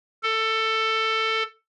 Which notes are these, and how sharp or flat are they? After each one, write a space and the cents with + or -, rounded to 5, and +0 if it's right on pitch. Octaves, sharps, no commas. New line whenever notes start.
A4 +15